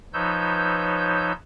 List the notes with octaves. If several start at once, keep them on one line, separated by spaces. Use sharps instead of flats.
F3 D#4 B4 C#5 E6 G6